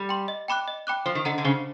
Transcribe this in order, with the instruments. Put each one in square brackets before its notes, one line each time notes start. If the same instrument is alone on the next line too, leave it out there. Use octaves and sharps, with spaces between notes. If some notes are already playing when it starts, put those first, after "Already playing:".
Already playing: [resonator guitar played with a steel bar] G3
[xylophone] G5 C6
D#5
G5 B5 D6 F#6
D#5
G5 B5 D6 F#6
[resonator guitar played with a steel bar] F3 [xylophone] C5
[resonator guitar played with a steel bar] D#3
[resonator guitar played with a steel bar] D3 [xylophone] D#5 F#5 A#5
[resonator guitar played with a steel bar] D3
[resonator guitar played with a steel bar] C#3 [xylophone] C5